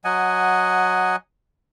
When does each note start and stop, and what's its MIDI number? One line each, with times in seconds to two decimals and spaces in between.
0.04 1.16 54
0.04 1.16 75
0.04 1.16 78
0.04 1.16 80